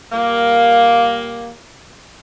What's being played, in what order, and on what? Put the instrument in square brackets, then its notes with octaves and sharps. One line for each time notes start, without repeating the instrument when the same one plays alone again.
[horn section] A#2 G3 A#3